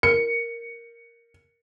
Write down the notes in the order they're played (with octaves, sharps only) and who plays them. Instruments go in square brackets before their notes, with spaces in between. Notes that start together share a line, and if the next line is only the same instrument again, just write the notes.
[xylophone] A#4 [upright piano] C#7